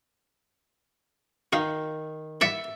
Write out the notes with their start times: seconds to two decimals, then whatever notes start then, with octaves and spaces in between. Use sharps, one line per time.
1.53 D#3 F#4 F5
2.41 E4 D5 E5 F#5